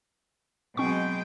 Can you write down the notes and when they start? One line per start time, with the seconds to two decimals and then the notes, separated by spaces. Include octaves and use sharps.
0.77 B2 F#3 G#3 C4 G5 C#6